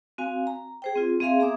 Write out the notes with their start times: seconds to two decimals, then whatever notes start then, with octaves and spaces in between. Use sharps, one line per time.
0.18 C4 F#4 F5 G#5
0.47 A#5
0.82 G#4 C5 G5
0.95 C4 F4
1.20 C4 G#4 E5 F5 G#5 C6
1.39 B3 G#4 E5 A#5 D6 D#6